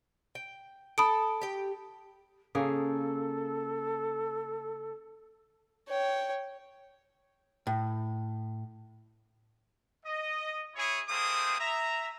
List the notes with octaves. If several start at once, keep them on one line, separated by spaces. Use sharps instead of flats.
G5
A4 B5 D#6 D7
G4 G5
C#3 A#3 G#4 A4
C#5 G5
A2
D#5
E4 G#4 C#5
A3 A#3 C4 G#4 C5 D#6
E5 A#5